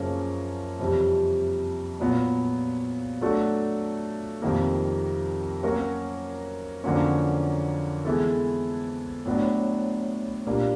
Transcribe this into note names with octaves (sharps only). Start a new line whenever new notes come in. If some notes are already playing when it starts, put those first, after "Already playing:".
Already playing: F#2 C#3 F3 A#3 C#4
F2 C3 E3 G3
A#2 F#3 B3
F#3 A3 D4 F#4 A4
F2 C3 D#3 G3 A#3
F#3 A#3 C#4 F#4 A#4
F2 D3 F#3 A#3 C#4
E3 G#3 B3 E4 A4
A2 F#3 B3 D4
A#2 G3 A#3 D4